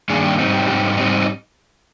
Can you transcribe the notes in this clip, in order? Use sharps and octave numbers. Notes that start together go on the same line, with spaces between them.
G2 D#3 A#3 D4 G#4
G4
G#2 G3 C4 D#4
G4
G#2 G3 C4 D#4 G4
G#2 G3 C4 D#4